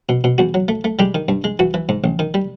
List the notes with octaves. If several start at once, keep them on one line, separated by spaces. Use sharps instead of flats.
B2
B2
E2 F#4
F#3
A3
A3
G3 G#3 G4
D#3
G2
G#3
E3 F#4
E3
G#2
A1
D#3
G3